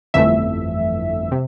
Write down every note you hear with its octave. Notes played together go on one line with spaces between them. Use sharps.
G1 F2 E3 A3 E5
C3